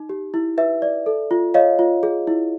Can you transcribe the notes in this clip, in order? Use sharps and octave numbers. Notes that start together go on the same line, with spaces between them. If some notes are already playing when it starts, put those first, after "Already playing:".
Already playing: D#4
G4
E4
B4 E5
D5
A4
F4
C#5 D#5 F5
F4
G#4
E4